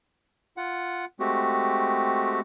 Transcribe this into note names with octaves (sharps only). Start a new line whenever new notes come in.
F4 F#5
G#3 A3 C4 F#4 G4